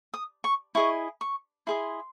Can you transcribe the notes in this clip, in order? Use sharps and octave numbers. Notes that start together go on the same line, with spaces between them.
D#6
C#6
E4 G#4 D#5 C#6
C#6
E4 G#4 D#5 C6